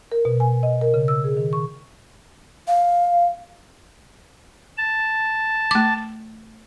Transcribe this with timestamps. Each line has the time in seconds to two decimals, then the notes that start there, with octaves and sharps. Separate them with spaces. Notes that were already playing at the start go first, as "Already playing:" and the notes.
0.12 A#4
0.25 B2
0.40 G#5
0.63 D#5
0.81 A#4
0.94 C#3
1.08 E6
1.24 G#4
1.37 D#3
1.53 C#6
2.68 F5
4.78 A5
5.71 A3 D6